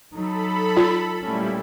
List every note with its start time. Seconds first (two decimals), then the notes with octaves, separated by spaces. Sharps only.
0.13 F#3 D#4 A4 B5
0.77 F4
1.22 A#2 G3 A3 C#4 E4